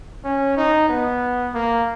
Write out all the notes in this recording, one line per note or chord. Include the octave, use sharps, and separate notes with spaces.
C#4
D#4
B3
A#3